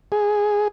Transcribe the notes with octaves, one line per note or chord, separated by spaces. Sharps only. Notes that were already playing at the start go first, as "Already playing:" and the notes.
G#4